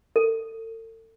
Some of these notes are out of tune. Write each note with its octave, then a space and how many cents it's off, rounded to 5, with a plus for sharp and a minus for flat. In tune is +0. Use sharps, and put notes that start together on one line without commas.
A4 +40